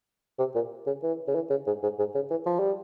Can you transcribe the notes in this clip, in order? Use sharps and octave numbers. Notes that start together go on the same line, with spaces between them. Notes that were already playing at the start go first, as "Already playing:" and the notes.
C3
A#2
C#3
E3
C#3
E3
C#3
G#2
G#2
G#2
C#3
E3
F3
G3